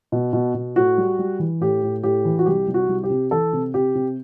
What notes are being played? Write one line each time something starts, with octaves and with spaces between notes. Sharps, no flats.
B2
B2
B2
A2 F#4
G3
G3
E3
A2 G4
A2
A2 G4
E3
F#4
C2 G4
C2
F#4
C2
G4
C3
E3 A4
C3
C3 G4
C3